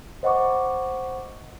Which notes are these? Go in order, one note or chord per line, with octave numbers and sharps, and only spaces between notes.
C5 D#5 F#5 B5 C#6 D6